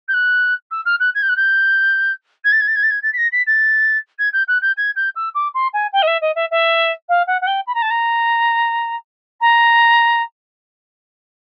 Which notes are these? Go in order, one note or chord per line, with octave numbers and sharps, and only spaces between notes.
G6
F#6
E6
F6
F#6
G#6
G6
F#6
G6
G#6
A6
G#6
A6
G#6
A6
G#6
A6
B6
A#6
B6
A6
G#6
G6
F#6
G6
G#6
G6
E6
D6
C6
G#5
G5
D#5
E5
D#5
E5
E5
F5
F#5
F#5
G5
B5
A#5
A5
A#5
A#5